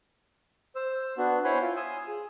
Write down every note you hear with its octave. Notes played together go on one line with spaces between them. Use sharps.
C5 E6
B3 D4 F#4
E4 C5 C#5 G#5 B5 C6
F4
G#5 C6 D#6 E6
G#4